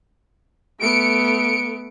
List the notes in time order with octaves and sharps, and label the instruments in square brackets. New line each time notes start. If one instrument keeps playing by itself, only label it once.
[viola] A3 B3 [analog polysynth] C#7 D7